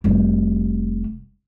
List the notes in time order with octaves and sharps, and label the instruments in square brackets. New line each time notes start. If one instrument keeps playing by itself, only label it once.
[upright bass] F1 G3